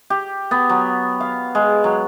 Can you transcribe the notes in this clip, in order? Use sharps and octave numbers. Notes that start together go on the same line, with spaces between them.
G4
B3
F#3
F5
G#3
F#3